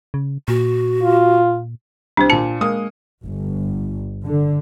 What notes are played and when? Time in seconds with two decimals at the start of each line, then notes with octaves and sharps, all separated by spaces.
0.14 C#3
0.48 A#2 F#4
1.02 F4
2.17 C2 D4 C5
2.30 A#2 A5 C#7
2.61 G#3 A#3 D#6
3.23 G1
4.25 D3